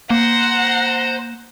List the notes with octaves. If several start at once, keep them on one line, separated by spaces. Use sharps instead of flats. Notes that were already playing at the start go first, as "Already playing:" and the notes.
A#3 C5 F#5 A#5